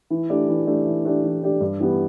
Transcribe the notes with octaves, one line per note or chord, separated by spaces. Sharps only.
E3
A3 D4 G4 D5
E3
A3 D4 G4 D5
E3
A3 D4 G4 D5
E3
A3 D4 G4 D5
G2
E3 G3 B3 G4